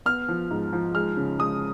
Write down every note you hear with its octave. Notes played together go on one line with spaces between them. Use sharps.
B3 F6
F3
G#2
F3
G#3 F6
C#3
G#3 D#6